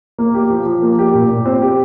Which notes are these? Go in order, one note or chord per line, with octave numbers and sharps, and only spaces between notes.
A#3
G4
F3
F3
A#3
G4
A#2
A#2
C4
G4